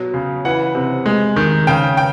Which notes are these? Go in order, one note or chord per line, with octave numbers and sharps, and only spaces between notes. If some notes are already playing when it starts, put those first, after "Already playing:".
Already playing: B2 F#3
C#3
E3 F#5
C3
G#3
D#3
C#3 G5
G5